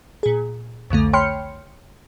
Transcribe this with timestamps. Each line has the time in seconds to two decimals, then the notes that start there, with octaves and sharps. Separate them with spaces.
0.23 A#2 G#4
0.90 C2 F2 D3 A3
1.13 C#5 G5 B5 C6 F6 C#7